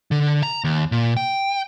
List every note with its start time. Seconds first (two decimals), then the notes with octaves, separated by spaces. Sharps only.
0.11 D3
0.43 A#5
0.64 D#2
0.92 A#2
1.17 G5